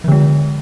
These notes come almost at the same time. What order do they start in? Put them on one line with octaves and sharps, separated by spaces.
F3 D3 G#3